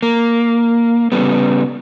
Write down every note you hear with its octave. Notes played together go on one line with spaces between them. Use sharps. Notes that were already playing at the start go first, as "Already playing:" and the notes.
A#3
C#3 G3 B3